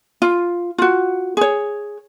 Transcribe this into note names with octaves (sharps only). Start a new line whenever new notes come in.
F4
F4 F#4
G#4 C#5